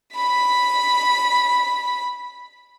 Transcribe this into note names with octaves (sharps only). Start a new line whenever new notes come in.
B5 B6